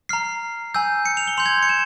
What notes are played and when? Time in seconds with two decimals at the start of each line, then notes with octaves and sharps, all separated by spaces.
0.09 A#5 F6 C7
0.74 G#5 E6 G6
1.06 C#7
1.17 F7
1.27 G7
1.37 C6 G6 F7
1.46 G#6
1.63 C#7
1.69 E7